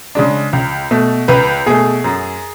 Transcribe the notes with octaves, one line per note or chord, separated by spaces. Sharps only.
C#3 G#3 D4
C#2
B2 A3
C#2 B4
B2 A3 G#4
F#2